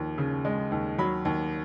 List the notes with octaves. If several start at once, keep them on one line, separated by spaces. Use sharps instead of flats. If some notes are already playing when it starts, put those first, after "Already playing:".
Already playing: D#2 F3
C#3
G#3
D#2
F#3 B5
D#2